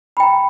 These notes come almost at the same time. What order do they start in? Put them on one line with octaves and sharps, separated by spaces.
B5 G5 A#5